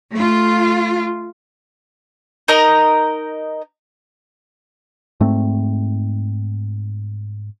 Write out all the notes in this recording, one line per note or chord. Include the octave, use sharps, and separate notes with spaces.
A3 F4
D#4 A#4 D#5 A#5
G#2 A3 C4